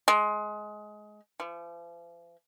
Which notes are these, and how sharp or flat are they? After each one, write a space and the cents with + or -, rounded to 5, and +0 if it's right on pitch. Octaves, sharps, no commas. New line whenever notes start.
G#3 +20
F3 -45